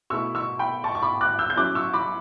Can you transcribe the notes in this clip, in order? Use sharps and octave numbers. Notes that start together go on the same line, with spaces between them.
B2 A3 E4 C#6 E6
C#6 E6
G5 B5
A5 C#6
C#6
B5 D6
D6 F#6
E6 G6
G6
F#3 C#4 E4 D6 F#6
C#6 E6
B5 D6